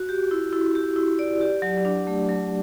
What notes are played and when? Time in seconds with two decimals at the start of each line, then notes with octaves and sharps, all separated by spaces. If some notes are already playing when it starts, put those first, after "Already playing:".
Already playing: F#4
0.09 G4
0.31 E4
0.53 E4
0.75 G4
0.96 E4
1.19 D5
1.41 G4
1.62 F#3
1.85 D4
2.07 A3
2.29 F#3